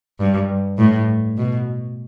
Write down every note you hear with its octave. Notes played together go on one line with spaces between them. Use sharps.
G2
A2
B2